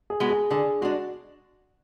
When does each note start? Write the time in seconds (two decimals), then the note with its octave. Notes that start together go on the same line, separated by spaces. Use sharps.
0.10 G#4
0.20 G#3 B3 F#4
0.30 G#4
0.51 D3 G#4
0.81 G#3 D4 F#4